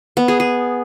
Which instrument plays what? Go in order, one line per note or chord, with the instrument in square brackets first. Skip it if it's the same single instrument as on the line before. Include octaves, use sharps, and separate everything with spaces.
[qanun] B3
G#4
G#4